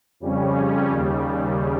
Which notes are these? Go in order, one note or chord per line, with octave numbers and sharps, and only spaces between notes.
F2 C#3 G3 C#4
D#2 C#3 G3